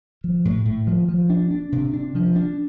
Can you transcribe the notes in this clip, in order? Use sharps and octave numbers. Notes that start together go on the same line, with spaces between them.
F3
A2
A2
F3
F3
D4
D4
C3
D4
F3
D4